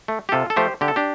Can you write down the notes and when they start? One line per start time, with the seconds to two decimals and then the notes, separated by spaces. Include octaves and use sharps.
0.08 A3
0.29 G4
0.32 C3 F4 A4
0.50 A4
0.56 F3 A3 G4 C5
0.81 D3 G4
0.88 A4
0.96 D4 G4